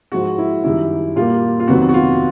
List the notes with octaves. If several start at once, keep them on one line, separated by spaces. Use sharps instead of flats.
G#2 F3 G#3 F#4
E4
F#2 D#3 G3 E4
A#2 G3 A#3 F4
F4
F2 C3 D#3 F#3 B3 F#4
F#4
F4